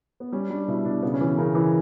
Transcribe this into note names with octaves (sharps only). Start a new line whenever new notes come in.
B3
G3 C#4
G3 D4
B2 E4
B2 D4
C#3 B3
C#4
E3 B3
C#3 A#4
E3